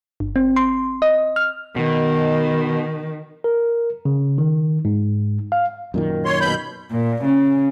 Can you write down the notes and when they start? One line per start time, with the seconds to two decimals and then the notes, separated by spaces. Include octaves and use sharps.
0.20 G1
0.36 C4
0.56 C6
1.02 D#5
1.36 F6
1.76 B2 D#3
3.44 A#4
4.05 C#3
4.38 D#3
4.85 G#2
5.52 F5
5.94 F#2 A#2 D#3
6.25 C#5 C6
6.41 B2 B5 G6
6.91 A#2
7.25 C#3